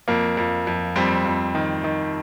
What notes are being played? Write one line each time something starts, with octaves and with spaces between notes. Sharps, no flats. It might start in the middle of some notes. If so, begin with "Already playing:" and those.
F2 A#3
F2
F2
F2 G3 C4
F2
D#3
D#3